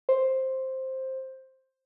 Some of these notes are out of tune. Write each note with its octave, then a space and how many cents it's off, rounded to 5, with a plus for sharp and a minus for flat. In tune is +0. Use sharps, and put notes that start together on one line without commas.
C5 +5